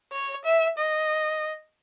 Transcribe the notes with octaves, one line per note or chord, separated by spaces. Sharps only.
C#5
E5
D#5